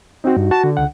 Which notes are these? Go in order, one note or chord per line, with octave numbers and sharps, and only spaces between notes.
C4 D#4 F#4
G2
F#4 A5
D3
C#2 F#5